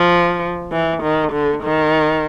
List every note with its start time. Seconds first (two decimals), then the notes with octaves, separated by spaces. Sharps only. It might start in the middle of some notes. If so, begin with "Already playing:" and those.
Already playing: F3
0.72 E3
1.03 D#3
1.32 D3
1.63 D#3